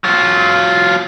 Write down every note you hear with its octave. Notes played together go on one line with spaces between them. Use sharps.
F#3 F4